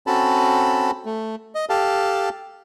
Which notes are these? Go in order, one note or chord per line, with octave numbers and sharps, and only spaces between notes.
C4 C#4 F#4 A4 A5 B5
A3
D#5
G4 A4 F5 A5